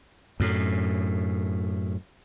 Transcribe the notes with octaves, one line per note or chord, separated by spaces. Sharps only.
F#2 A2